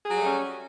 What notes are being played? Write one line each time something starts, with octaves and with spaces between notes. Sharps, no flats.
F#3 G3 A3 C#4 G#4